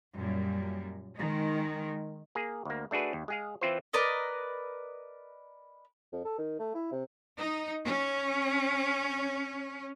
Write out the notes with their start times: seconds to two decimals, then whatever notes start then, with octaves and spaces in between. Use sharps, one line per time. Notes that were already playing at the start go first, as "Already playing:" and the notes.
0.14 F#2 A#2 G3
1.18 D#3 G#3
2.35 A#3 G#4
2.65 D2 A#3
2.91 A3 D4 F#4 G#4 B4
3.13 D#2
3.28 G#3 G#4 F5
3.61 E3 C4 E4 F4 B4 C5
3.93 A#4 B4 D5 D#5
6.12 F2
6.25 A4
6.38 D#3
6.59 A3
6.75 E4
6.92 C3
7.37 D#4
7.85 C#4